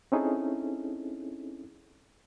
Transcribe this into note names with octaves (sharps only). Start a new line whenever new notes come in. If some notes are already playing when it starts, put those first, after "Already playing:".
C4 C#4 D#4 E4 G#4 A4